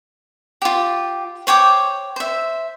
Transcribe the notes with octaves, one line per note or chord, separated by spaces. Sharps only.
F4 G4
C5 C#5 G5 D6
C5 E5